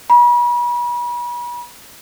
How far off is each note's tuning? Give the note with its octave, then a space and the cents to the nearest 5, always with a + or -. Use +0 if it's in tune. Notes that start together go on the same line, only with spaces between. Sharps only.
B5 -40